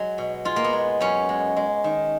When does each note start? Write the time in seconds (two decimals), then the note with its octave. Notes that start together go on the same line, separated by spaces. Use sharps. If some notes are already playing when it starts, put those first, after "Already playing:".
Already playing: F#3 G#3
0.18 B2
0.45 G#3 F4
0.56 A#3
0.64 B3
0.73 G#3
1.01 F#2 C#4
1.29 G#3
1.56 G#3
1.84 D#3